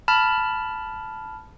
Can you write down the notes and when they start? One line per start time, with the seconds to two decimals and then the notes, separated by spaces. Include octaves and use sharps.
0.08 A5 B5 F6